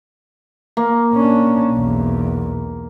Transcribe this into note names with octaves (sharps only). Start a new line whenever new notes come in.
A#3
C#4 D4
B1 E2